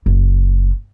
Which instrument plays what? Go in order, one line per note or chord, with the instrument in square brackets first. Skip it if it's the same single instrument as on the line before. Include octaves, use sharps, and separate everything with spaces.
[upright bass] F#1